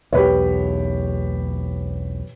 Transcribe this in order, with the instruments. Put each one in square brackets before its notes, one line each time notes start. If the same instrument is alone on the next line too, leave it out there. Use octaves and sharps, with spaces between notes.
[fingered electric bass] B1 E2 B3 [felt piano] G4 B4 C#5